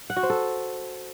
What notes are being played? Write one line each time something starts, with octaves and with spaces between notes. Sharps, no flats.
F#5
F#4
C5
A4